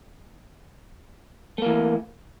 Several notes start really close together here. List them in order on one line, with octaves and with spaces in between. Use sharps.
A3 A#3 E3